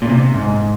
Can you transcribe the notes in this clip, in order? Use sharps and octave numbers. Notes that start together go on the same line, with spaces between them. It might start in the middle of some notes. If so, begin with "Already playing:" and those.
A#2
C3
G#2